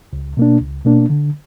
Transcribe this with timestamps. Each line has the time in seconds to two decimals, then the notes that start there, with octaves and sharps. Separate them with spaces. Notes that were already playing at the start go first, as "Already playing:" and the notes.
0.13 C#2
0.37 B2 A#3 D4
0.61 C#2
0.85 B2 A#3 D4
1.10 D3